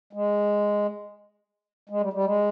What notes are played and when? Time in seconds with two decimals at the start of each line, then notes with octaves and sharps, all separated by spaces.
0.13 G#3
1.89 G#3
2.01 G3
2.13 G3
2.24 G#3